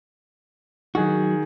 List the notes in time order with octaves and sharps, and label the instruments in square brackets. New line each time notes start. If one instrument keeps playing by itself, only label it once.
[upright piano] D#3 G#4 [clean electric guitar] F#3 F#4